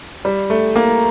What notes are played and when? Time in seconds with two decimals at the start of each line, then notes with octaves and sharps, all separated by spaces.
0.25 G3
0.50 A3
0.76 A#3